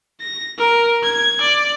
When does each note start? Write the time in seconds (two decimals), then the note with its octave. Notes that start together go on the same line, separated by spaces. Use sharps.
0.21 A#6
0.58 A#4
1.03 G#6
1.41 D5